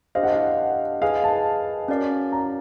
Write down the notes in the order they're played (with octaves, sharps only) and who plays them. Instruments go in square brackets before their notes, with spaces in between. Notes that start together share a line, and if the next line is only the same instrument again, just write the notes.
[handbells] D4 G4 C5 D#5 [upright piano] F5
[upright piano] F#5
F5
[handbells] G#4 B4 D#5 G#5 [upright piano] F5
[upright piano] A5
[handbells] C#4 F#4 A#4 D5 F5
[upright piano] A#5